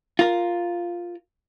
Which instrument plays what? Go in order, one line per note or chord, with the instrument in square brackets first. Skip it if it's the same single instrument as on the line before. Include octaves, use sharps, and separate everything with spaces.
[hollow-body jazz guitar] F4 A#4